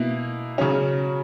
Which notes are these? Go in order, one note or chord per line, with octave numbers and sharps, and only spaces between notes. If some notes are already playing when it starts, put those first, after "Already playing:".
Already playing: B2 A#3 E4
C#3 F#3 C#4